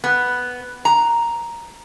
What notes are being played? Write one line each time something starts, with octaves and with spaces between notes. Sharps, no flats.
B3
A#5